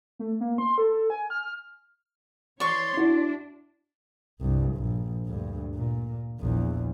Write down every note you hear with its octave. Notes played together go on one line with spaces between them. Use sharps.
A3
A#3
C6
A4
G#5
F6
E3 C#5 D5 C6 C#6
D4 E4 F#4
C2 G2
A#1
D2 G2
A#2
A#1 E2